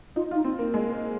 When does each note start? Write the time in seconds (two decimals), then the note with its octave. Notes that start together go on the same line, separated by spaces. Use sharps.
0.16 D#4 F4
0.31 F4
0.35 D#4
0.44 C4
0.59 A#3
0.74 G#3
0.93 A#3